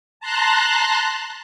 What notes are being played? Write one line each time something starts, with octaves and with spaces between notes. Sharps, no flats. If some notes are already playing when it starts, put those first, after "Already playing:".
A5 A#5 C6 F#6